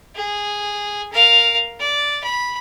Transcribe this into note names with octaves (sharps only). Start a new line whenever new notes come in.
G#4
A#4 F5
D5
B5